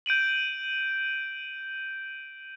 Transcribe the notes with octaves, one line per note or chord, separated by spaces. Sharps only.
G6 D7 D#7 F#7